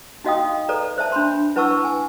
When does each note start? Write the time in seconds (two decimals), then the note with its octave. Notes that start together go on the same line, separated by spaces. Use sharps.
0.24 D#4 F#4 D#5 F5 G5 D#6
0.69 A4 B4 D5 A#5
0.98 C5 E5 A5
1.12 D4 B5 C6
1.56 E4 B4 F#5 A5 C#6 E6
1.85 G#5